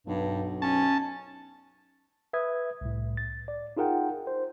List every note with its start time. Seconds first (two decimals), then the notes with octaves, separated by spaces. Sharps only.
0.07 B1 G2
0.62 C#4 A5
2.33 B4 E5 D#6 G#6
2.81 C2 A2
3.17 A6
3.48 D5
3.77 D#4 F4 G#4 A#4 F#5 G5
4.27 C5